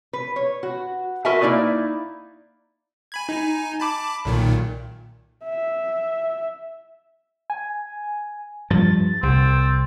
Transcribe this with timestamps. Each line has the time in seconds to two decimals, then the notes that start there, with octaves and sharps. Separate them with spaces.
0.13 B4
0.36 C#5
0.63 F#4
1.25 F#4 A#4 B4 D#5 E5 G#5
1.42 A#3 D#4 E4 D5
3.12 G#5 B5 G#6
3.29 D#4 G#5
3.80 A5 B5 D6
4.25 B1 A#2 D#3
5.44 E5
7.50 G#5
8.70 G2 F3 A6
9.23 C2 C4